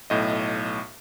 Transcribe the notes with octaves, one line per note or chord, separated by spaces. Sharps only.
B1 A2 D#5